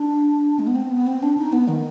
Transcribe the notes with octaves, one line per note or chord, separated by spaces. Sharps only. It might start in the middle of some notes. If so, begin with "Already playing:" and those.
Already playing: D4
G#3
B3
C4
B3
C4
D4
D#4
B3
D#3